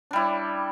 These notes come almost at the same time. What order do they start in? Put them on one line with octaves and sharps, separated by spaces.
D4 G3 E4